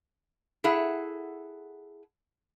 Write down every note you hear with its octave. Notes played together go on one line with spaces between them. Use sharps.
E4 G#4 A4 E5 F#5